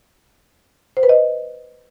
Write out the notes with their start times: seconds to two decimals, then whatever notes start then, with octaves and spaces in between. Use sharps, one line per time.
0.97 C5
1.03 B4
1.09 D#5